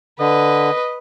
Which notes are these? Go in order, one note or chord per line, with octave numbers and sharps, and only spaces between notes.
D3 B4 D#5